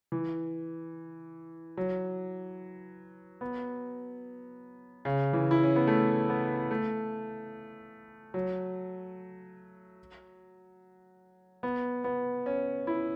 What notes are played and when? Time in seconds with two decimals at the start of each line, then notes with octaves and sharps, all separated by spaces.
0.12 E3
1.77 F#3
3.41 B3
5.05 C#3
5.33 E3
5.51 E4
5.63 C#4
5.76 B3
5.87 A3
6.29 B3
6.71 A3
8.34 F#3
11.63 B3
12.04 B3
12.46 C#4
12.87 E4